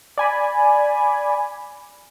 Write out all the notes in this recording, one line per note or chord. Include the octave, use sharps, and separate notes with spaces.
D5 G#5 B5